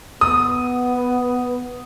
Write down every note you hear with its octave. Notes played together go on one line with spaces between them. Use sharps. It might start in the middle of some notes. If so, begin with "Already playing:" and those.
B3 D#6